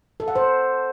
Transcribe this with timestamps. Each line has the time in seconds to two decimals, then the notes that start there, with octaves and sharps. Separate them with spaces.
0.20 A4
0.28 F#5
0.36 C5